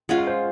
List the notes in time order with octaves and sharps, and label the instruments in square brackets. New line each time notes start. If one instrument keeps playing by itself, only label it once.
[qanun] G#3 C#4 F4 [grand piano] F#5
[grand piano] F5
C5